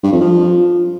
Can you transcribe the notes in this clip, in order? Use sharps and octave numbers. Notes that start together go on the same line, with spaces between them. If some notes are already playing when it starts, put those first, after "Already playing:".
G2
F2
F3